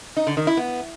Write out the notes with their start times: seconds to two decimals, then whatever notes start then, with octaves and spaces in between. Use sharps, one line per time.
0.17 D#4
0.27 D3
0.37 D#3
0.47 E4
0.57 B3